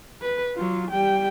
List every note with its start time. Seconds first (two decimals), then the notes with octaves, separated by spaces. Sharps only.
0.22 B4
0.55 F#3 F4
0.91 G3 G5